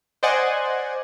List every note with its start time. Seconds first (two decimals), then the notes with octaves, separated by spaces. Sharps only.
0.23 C5 D5 D#5 F#5 G#5